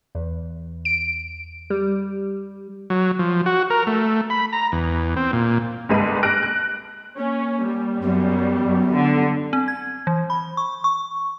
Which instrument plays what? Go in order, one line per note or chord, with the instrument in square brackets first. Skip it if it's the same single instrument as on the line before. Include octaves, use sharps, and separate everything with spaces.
[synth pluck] E2
D7
G3
[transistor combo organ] F#3
F3
F#4
A#4
A3
B5
A#5
E2
C4
A#2
[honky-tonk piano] G1 C2 G#2 B4 D#7
F6 F#6 A#6 D7
F#6
[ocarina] A#3 [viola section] C#4
[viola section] G3
[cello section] F#2 [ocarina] B3
[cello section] F#2
D3
[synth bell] C4
G#6
E3
B5
C#6
C#6